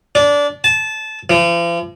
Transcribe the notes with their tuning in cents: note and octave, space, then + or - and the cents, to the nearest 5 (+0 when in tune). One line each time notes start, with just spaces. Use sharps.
D4 -20
A5 -20
F3 -45